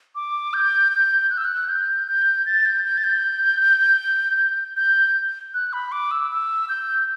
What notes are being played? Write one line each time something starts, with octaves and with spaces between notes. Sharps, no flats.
D6
G6
G6
F#6
E6
F#6
G6
G6
A6
G6
G6
A6
G6
G6
F#6
B5
D6
E6
E6
G6